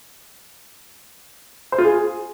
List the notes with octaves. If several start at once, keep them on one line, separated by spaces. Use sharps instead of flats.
C5
F4
G#4